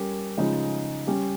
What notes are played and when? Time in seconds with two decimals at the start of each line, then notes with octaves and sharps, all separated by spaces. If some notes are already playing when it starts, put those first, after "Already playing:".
Already playing: G3 C#4 G4 A#4
0.38 C#3 F3 G#3 D#4
1.07 G3 C#4 G4